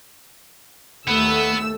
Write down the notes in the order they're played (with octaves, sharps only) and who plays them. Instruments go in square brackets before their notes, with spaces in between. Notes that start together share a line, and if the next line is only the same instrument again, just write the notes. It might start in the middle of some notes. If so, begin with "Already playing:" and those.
[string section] D#2 A3 E6 [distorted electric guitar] B3